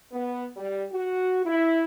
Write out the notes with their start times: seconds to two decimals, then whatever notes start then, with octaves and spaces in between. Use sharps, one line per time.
0.12 B3
0.57 G3
0.92 F#4
1.44 E4